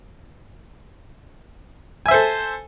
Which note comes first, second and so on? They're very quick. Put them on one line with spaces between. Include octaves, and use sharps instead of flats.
G#5 E5 C5 A4